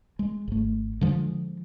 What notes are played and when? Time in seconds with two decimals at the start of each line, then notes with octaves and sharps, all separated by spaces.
0.19 G#3
0.48 G#1 A3
1.01 D3 F3 G#3